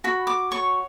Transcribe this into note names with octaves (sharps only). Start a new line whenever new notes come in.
F#4 B5
D6
C#5 C#6